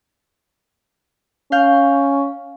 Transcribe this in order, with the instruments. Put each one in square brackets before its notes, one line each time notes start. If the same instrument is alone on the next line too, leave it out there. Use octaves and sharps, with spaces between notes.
[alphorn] C#4 [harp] F5 G6